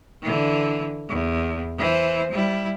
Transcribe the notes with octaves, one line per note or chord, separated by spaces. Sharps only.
D3 E3
E2
E3 C5
G3 E4